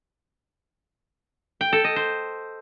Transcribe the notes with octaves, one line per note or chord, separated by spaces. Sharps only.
G5
A4
D#5
C5